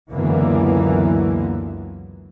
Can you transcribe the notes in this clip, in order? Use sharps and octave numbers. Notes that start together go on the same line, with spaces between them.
C#2 F#2 D3 E3 A#3 B3